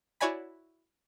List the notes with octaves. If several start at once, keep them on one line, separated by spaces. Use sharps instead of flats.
E4 F#4 C#5 D5 G#5 B5